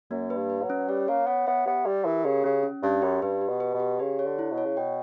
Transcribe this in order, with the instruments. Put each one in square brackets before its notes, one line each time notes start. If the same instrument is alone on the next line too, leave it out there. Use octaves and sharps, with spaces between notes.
[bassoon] F#2 [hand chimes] A#3
[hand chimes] B4
[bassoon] G2
[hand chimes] B4
[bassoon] F#3
[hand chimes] C#4
[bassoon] G3 [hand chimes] C#5
[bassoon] A#3 [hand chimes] C#5
[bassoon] B3 [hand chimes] C#5
[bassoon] B3 [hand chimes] E5
[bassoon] B3 [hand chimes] G4
[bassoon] G3 [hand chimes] G4
[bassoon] E3 [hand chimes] A#4
[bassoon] C#3 [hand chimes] G4
[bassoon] C#3 [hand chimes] C#4
[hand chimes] C#4
[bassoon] G2 [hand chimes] C#4
[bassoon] F#2 [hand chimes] G4
[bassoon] G2 [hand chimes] B4
[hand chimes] G4
[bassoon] B2
[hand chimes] B4
[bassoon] B2
[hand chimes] G4
[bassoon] C#3 [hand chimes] G4
[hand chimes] C#5
[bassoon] D3
[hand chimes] E4
[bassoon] B2
[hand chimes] C#5
[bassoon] C#3
[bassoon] B2 [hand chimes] G5